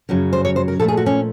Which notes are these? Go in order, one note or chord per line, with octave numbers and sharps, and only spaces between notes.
F#2 C#3 F#3
C5
C#5
C5
A#4
A#2 F3 A3 A4
G#4
F#4
C#4